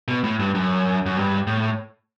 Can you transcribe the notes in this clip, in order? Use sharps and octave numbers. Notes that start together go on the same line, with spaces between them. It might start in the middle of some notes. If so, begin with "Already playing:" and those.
B2
A2
G2
F#2
F#2
G2
A2